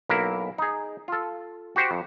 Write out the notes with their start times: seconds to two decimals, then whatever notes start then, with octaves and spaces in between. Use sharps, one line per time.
0.09 B1 A#3 E4 A#4
0.58 D#4 G#4
1.08 F4 A4
1.76 F#4 G4 C5 G5
1.91 F2